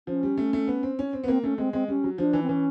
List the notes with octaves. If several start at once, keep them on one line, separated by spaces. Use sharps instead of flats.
F3 C#4
G3
A3
A3
B3
C4
C#4
C4
B3
A#3 C4
A3 C#4
G#3 C4
G#3 C4
G3 C#4
F#3
F3 D4
E3
C4
E3 C#4